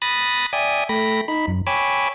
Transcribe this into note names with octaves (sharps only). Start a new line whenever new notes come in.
B5 D#6 F#6 A6 A#6
D5 E5 G5 G#5 D#6
A3 G5 B5 A#6
D#4 B5
F#2
C#5 G5 G#5 B5 D6 E6